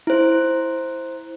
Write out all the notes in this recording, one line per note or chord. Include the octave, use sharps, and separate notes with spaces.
E4 C5